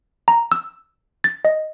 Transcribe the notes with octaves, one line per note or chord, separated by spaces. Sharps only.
A#5
E6
A6
D#5